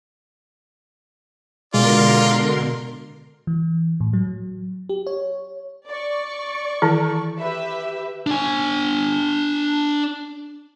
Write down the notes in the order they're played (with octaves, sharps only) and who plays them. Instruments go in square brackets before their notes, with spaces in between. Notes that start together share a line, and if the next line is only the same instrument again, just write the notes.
[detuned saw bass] B2 [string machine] D3 A#4 C6 [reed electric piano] G#3 [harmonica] F4 D5
[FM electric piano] E3
A2
F#3
G4
C#5
[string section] D5 C#6
[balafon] D#3 E3 E4
[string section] G4 B4 E5
[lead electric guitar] D4 G#5